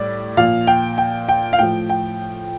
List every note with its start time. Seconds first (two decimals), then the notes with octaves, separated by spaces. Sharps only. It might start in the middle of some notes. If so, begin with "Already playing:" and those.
Already playing: A2 G3 D5
0.37 A#2 F3 F5
0.67 G5
0.98 G5
1.29 G5
1.53 F5
1.59 A2 F3 G5
1.89 G5